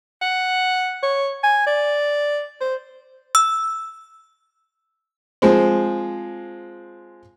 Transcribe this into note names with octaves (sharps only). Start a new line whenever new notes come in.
F#5
C#5
G#5
D5
C5
E6
F3 G#3 C4